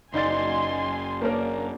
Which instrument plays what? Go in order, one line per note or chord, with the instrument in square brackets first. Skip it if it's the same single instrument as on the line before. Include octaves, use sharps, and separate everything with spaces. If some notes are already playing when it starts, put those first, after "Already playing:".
[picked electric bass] F#1 [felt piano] D#4 D5 A6 [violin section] G#5 C6
[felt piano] A#3 C#4 A#4 [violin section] D4